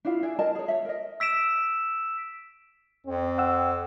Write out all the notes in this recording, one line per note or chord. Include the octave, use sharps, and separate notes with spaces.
D4 E4 F4 F5
D4 E4 G#4 D5
A#4 D#5 G#5 A5
G#4 C#5
C#5 E5
A#4 D#5
E6 B6 D7 E7
F2 C4
F#5 E6